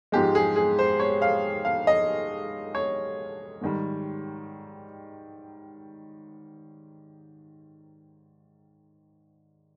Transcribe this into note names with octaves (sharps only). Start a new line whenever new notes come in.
G#2 F3 G#3 G4
G#4
G#4
C5
C#5
F5
F5
D#5
C#5
G#2 D#3 G3